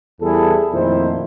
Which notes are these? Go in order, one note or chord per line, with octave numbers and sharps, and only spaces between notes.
E2 G3 E4 G#4 A4
F2 A#2 D#3 A3 E4 C5